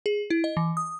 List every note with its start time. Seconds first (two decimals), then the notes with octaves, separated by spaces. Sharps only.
0.06 G#4
0.30 E4
0.44 D#5
0.57 E3
0.77 D#6